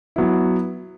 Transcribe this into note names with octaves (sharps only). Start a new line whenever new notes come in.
F#3 B3 E4